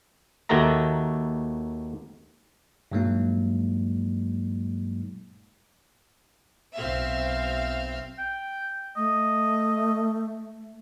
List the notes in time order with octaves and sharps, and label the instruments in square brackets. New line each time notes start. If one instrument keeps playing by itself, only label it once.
[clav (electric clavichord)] D#2 D#3 F#4 A4 E5 A#5
[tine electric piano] G2 A#2 F#3 G#3 A#3 D#4
[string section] B1 C4 E5 F5
[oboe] G5
[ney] A3 [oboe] D#5